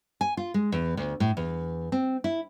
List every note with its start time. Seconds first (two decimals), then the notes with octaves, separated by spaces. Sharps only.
0.21 G#5
0.37 F4
0.54 G#3
0.72 E2
0.97 D2
1.20 A2
1.37 E2
1.92 C4
2.24 E4